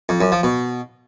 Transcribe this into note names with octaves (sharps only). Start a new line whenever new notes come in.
F2
F#2
F3
B2